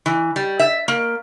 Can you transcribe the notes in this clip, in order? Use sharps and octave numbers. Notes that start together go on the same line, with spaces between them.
E3
G3
E5
A#3